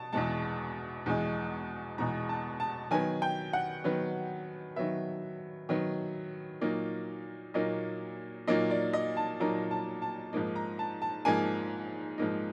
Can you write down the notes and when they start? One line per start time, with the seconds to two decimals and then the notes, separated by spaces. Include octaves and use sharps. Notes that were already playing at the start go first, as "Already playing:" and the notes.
Already playing: B2 A5
0.13 E2 B2 G#3 A5
1.06 E2 B2 G#3
1.98 E2 B2 G#3 A#5
2.29 A5
2.60 A5
2.91 D#3 F#3 B3 G#5
3.22 G5
3.53 F#5
3.84 D#3 F#3 B3
4.76 D#3 F#3 B3 E5
5.69 D#3 F#3 B3
6.61 A#2 F#3 A#3 D#4
7.54 A#2 F#3 A#3 D#4 D#5
8.47 A#2 F#3 A#3 D#4 D#5
8.71 D5
8.93 D#5
9.17 A5
9.40 A#2 F#3 A#3 D#4 A#5
9.71 A5
10.02 A5
10.33 G#2 F3 A#3 D#4
10.56 A#5
10.79 A5
11.02 A5
11.25 G#2 F3 A#3 D#4 G#5
12.18 G#2 F3 A#3 D#4